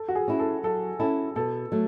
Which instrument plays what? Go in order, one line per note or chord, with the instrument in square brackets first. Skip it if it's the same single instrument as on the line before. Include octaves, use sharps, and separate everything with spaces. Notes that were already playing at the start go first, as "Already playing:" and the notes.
Already playing: [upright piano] A4
F#4
G#4
[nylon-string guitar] C#4 E4
[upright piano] A4
[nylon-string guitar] F#3 [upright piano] A4
[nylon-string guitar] C#4 E4 [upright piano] A4
[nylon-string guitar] B2 [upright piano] A4
[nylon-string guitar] F#3 A3